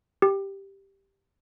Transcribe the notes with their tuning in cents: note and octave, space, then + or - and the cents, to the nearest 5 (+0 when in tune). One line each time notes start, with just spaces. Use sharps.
G4 +0